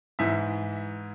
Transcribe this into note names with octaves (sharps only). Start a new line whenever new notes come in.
G#2 E3 E5